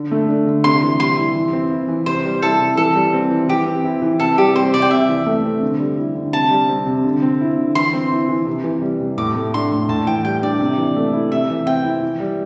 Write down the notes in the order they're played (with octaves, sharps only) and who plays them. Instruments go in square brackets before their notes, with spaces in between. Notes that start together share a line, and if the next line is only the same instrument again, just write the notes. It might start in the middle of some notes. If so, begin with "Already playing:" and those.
Already playing: [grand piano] D3
A3
D4
D3
[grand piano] C3 [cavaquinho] C6
[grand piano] E3
[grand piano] G3 [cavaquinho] C6
[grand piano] E4
E3
C4
E4
E3
[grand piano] C3 [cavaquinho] C5
[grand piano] G3
[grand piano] E4 [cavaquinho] A4
[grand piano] C3
[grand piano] E3 [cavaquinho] A4
[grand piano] G3
C4
E3
[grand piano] E3 [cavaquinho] G4
[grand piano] C4
E4
E3
[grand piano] C3 [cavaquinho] A4
[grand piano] G3 [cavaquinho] G4
[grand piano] C4 [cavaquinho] C5
[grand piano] C3 [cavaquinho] D5
[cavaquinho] G5
[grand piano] C3 [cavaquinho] E5
[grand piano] E3
A3
C4
D3
G3
E4
D3
[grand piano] C3 [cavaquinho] A5
[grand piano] G3
C4
C3
D3
C4
E4
D3
[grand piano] E3 [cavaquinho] C6
[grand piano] C4
E4
E3
C3
E3
G3
C3
[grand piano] A2 [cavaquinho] D6
[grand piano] A3
[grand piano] D4 [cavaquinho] C6
[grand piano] A2
[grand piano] A2 [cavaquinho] A5
[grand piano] E3 [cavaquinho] G5
[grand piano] G3 [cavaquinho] G5
[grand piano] D4 [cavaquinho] D5
[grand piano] C3
E3
A3
E4
[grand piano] C3 [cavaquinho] E5
[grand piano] E3
[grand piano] C4 [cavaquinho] G5
[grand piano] E4
E3
G3